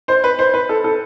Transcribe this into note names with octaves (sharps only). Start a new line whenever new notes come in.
C5
B4
C5
B4
A4
A4